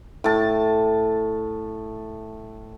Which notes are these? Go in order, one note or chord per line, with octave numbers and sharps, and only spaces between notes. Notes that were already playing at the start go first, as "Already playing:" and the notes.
A2 A5